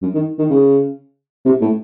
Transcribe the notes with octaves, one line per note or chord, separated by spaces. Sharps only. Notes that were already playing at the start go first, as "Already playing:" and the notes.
F#2
D#3
D#3
C#3
C3
A2